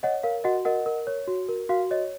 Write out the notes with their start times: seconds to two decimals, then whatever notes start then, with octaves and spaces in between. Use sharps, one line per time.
0.03 C#5 D#5 F#5
0.23 A#4 F5
0.44 F#4 D#5 F#5
0.65 A#4 D#5 F#5
0.86 A#4
1.07 C#5
1.28 F#4
1.48 A#4
1.69 F#4 F5
1.91 C#5 D#5